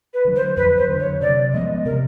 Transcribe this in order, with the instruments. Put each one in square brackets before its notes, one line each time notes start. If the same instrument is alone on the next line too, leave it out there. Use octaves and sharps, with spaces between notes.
[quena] B4
[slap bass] D3 F#3
[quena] C5
[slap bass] F2 [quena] B4
[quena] C5
[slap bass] D3 F#3
[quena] C#5
[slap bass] C3 [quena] D5
[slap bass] F3 G#3 B3 [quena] D#5
[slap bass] C3 [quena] A#4